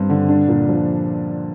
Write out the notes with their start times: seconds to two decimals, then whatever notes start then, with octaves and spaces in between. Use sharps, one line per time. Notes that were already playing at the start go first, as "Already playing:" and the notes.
Already playing: G2 C4
0.10 D3
0.29 D4
0.48 A#2
0.69 F3